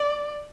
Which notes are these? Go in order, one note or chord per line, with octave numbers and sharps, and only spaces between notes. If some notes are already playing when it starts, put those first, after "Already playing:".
Already playing: D5